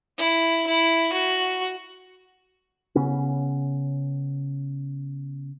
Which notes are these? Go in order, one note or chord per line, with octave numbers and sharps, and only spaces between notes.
E4
E4
F#4
C#3 B3 C#4